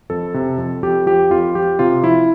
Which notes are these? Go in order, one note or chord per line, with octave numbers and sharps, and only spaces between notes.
F2 A4
C3
F2
F2 G4
F3 G4
F2 F4
F3 G4
C3 F4
F3 E4